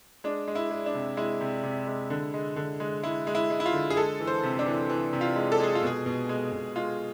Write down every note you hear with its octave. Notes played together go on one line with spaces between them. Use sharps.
G#3 D4
G#3
E4
G#3
D4
C3
G#3 E4
C3
C3
G#3
D3
G#3
D3
G#3
G#3 E4
G#3
E4
G#3
E4
F4
D3
G#4
G#3 A4
E3
C5
C3
D4
E3
E3
C3
F4
G#3
A4
G#3 G#4
F4
B2 G#4
B2
G#3
B2
G#3 F4